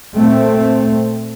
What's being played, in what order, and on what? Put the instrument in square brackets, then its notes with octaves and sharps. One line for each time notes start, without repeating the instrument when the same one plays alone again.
[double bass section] A#2 A3 C4